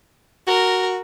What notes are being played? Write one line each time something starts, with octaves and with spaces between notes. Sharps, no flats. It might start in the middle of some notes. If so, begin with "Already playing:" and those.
F#4 A#4